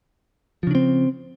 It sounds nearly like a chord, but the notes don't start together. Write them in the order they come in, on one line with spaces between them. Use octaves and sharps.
F3 C#3 D4 C4